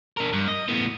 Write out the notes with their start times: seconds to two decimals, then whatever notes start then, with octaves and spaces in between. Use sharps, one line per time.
0.17 D4 A#4
0.33 G2
0.48 D#5
0.68 A2 B3